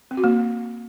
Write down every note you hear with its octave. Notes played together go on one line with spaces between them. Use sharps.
C4
F#4
A#3